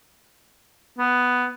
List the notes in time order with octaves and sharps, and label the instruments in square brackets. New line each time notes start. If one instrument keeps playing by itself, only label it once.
[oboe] B3